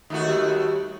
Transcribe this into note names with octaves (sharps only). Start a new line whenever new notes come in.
D#2 A3 F#4
G3